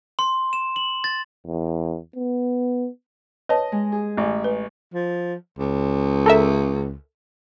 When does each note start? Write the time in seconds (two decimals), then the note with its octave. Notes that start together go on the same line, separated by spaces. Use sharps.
0.19 C6
0.53 E7
0.76 F#7
1.04 A6
1.46 E2
2.16 B3
3.49 B4 C#5 D#5 A5
3.72 G#3
3.92 G#4
4.17 A1
4.44 B4
4.94 F3
5.59 C#2
6.26 A4 A#4 E5